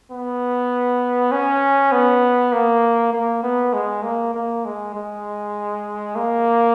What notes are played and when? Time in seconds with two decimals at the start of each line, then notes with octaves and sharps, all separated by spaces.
0.11 B3
1.32 C#4
1.92 B3
2.53 A#3
3.13 A#3
3.43 B3
3.74 G#3
4.03 A#3
4.34 A#3
4.65 G#3
4.95 G#3
6.16 A#3